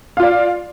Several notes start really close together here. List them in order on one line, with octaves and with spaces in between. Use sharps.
F5 F4 D5